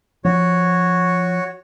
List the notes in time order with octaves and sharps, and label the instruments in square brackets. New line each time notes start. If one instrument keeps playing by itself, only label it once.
[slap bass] F3 [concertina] F#4 C#5